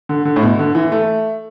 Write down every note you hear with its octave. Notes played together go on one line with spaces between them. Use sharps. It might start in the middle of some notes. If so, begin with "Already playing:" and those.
D3
D3
A2
B2
D3
E3
A3